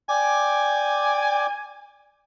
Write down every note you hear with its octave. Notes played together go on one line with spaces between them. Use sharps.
D5 G5 G#5 D6